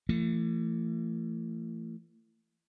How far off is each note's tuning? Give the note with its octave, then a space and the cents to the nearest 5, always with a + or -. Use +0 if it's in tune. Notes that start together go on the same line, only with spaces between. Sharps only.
E3 +35 A3 +30